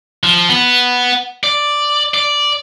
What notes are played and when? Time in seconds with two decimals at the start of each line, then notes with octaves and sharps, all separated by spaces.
0.24 F3
0.49 B3
1.44 D5
2.14 D5